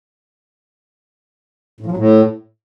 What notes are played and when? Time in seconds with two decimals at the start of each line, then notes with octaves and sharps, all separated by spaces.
1.80 A2
1.86 F3
1.91 F#3
1.97 A2